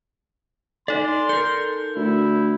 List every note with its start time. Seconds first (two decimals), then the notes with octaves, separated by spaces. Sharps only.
0.88 D#4 A4 D5 C6
1.29 A4 A#4 G6
1.96 D2 E4